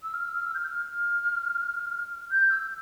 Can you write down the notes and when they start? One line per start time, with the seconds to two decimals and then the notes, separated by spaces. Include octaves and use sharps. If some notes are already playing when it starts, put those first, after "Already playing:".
0.02 E6
0.13 F6
0.23 E6
0.35 F6
0.45 E6
0.54 G6
0.59 F6
2.31 G6
2.50 E6